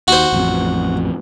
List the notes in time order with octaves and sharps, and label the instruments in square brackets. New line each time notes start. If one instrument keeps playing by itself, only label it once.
[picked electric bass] D#2 [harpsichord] F#4 C5
[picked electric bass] A1 F2